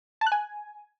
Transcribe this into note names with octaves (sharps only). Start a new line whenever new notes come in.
A5
F#6
G#5